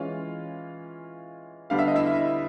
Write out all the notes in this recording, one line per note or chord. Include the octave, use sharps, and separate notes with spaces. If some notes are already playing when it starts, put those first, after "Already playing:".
Already playing: E3 G#3 C#4 F4 F5
D3 G3 B3 D4 F5
E5
D#5
E4 E5